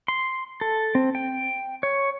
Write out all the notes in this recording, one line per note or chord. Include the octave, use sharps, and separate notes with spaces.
C6
A4
C4
G5
C#5